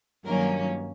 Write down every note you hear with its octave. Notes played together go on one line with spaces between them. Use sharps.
G2 D#3 F#3 A#3 C#4 A#4